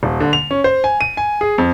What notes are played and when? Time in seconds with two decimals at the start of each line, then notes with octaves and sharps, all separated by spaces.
0.03 D#1
0.20 D3
0.33 F7
0.51 C#4
0.64 C5
0.84 G#5
1.01 D#7
1.17 G#5
1.41 G#4
1.58 F2